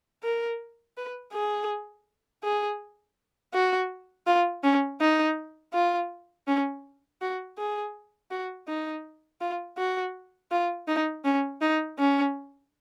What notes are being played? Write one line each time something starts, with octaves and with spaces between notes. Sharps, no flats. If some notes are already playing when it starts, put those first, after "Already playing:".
A#4
B4
G#4
G#4
F#4
F4
C#4
D#4
F4
C#4
F#4
G#4
F#4
D#4
F4
F#4
F4
D#4
C#4
D#4
C#4